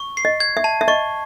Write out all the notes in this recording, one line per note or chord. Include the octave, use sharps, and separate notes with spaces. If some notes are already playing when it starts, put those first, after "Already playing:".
Already playing: C#6
C7
D#5
G#6
E5
A5
E5
D#5 C#6